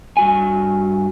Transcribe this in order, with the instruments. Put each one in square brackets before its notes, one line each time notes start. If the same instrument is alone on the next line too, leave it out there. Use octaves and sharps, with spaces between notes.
[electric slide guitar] G2 F#4 G#5